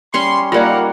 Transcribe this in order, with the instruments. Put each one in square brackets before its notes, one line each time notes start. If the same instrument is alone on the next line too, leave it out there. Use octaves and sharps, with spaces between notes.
[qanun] G3 C#4 C#6 [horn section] C6
[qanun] G3 A#3 D#4 [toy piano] F4 D5 [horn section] A#4 F#5